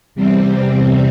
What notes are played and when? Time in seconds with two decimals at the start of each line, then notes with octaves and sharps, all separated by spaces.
0.15 E2 C3 G3 C4